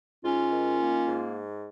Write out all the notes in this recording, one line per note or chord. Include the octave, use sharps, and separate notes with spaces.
G#2 C#4 F4
D#3
A#3
G#2